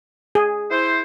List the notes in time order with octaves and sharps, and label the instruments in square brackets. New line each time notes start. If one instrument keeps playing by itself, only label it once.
[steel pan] G#4
[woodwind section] E4 C5